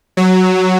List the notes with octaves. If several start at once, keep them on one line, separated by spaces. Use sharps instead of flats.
F#3